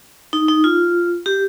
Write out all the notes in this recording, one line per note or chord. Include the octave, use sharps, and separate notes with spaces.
D#4
D#4
F4
G4